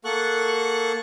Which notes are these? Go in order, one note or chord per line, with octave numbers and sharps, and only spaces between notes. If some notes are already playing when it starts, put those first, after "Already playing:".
A#3 A4 F#5 C#6 F#6